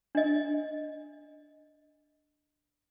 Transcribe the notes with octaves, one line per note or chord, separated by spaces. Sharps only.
D4 D#5